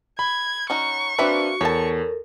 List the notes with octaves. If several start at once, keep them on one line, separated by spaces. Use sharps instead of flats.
B5 G#6
C#4 D#4 F#4 A#5 C#6
A#3 C4 D4 F#4 B4 E5
E2 A4 A#4 C#5 A5